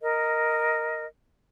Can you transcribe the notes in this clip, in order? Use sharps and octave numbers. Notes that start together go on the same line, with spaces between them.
A#4 D#5